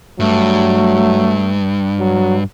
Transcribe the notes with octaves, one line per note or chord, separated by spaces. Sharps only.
G2 F#3 A3
F#3